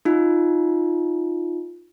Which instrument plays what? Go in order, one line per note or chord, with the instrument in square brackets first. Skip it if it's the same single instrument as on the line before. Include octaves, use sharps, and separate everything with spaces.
[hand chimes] D#4 F4